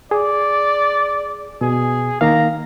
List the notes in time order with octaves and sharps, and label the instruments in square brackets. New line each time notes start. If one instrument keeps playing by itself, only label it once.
[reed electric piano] G#4 [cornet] D5
[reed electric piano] B2 [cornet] G#4
[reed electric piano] D#3 A#3 F5 [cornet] A#5